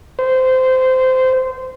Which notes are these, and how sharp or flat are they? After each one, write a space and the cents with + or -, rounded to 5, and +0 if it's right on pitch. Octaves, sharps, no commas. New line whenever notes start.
C5 -20